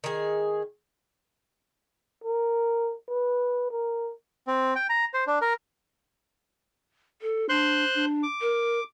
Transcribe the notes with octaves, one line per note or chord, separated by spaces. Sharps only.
D#3 G#4
A#4
B4
A#4
C4
G5
A#5
C5
D4
A#4
A4
D4 C5 C6 F#6
D4
D6
A#4